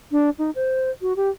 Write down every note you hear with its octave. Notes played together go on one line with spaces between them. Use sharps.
D4
D#4
C5
F#4
G4